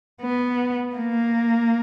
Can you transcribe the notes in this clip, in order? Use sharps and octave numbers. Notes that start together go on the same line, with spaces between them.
B3
A#3